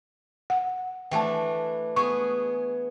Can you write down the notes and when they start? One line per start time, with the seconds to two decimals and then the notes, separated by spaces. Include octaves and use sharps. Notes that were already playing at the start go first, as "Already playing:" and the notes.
0.50 F#5
1.11 E3 A3 D4 G5 A5
1.96 B3 G#4 C#6